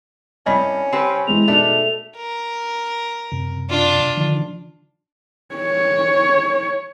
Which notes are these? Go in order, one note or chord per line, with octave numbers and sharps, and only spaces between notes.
C2 G2 G3 C#4 D#5
C4 G4 B4
E3 G#3 F7
B2 A3 D4 D#4 G#4
A#4
F#2 C3
D4 F4
D3 D#3 F3
C#5